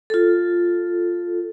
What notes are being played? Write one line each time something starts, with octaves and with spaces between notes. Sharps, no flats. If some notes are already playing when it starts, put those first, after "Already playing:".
F4 A4